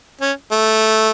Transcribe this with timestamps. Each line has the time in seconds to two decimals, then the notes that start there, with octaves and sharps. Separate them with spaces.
0.21 C#4
0.51 A3